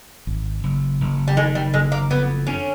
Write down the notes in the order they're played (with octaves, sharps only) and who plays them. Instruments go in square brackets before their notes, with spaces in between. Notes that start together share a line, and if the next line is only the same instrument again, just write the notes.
[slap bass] G#1
F#1
F#1
[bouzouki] G3
[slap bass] D#3 [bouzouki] G#3
[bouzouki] G3
[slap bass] F#1 [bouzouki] G#3
[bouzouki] A#3
[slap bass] F2 [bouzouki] B3
[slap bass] D3 [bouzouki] C#4